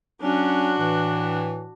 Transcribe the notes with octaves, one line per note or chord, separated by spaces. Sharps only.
F#3 C#4 D4 F#4
A2 E3